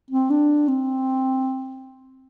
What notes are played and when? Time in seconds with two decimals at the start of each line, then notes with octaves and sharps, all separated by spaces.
0.11 C4
0.30 D4
0.68 C4